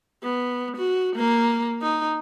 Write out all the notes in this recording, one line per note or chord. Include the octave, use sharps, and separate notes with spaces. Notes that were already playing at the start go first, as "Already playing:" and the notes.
B3
F#4
A#3
D#4